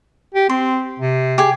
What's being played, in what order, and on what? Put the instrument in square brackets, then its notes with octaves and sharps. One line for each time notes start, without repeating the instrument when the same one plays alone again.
[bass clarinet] G4
[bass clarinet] C4 [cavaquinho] C6
[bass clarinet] C3
[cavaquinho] G4 G#4